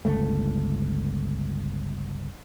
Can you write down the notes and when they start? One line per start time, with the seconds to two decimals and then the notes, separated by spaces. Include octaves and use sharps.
0.05 G1 C#2 A3